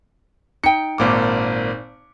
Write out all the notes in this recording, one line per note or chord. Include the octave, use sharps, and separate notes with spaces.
D#4 G5 C#7
G#1 A#2 D6